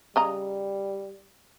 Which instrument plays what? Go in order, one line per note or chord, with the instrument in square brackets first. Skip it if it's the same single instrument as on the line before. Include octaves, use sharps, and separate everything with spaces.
[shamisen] C#3 D#5 A#5 [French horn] G3